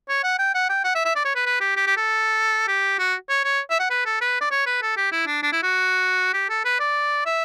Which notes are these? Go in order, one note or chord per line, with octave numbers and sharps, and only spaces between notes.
C#5
F#5
G5
F#5
G5
F#5
E5
E5
D5
C#5
B4
B4
G4
G4
G4
A4
G4
F#4
C#5
C#5
E5
F#5
B4
A4
B4
D5
C#5
B4
A4
G4
E4
D4
D4
E4
F#4
G4
A4
B4
D5
E5